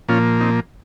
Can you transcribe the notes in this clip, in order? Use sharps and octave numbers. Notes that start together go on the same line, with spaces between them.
A#2 F3 A#3 C#4 F4
C4 D#4